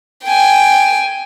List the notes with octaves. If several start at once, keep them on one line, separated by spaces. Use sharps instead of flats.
G5 G#5